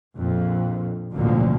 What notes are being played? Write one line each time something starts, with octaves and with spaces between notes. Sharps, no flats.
A#1 F2
A1 D2 B2 D3 F3 A#3